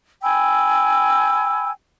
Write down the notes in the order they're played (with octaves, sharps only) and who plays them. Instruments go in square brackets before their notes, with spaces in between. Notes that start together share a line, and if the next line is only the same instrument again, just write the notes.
[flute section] G5 G#5 B5 E6